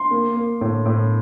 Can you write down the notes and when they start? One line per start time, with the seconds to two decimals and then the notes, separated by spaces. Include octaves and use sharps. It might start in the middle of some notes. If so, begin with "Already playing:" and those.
Already playing: C6
0.11 A#3
0.36 A#3
0.61 A2
0.86 A2